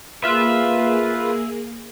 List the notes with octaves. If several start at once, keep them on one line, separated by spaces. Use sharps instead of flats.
A#3 F4 G#4 B4 E5